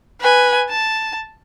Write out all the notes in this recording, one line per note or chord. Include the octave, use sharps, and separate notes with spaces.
B4 G#5
A5